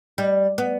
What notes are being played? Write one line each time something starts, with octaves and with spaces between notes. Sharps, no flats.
G3
B3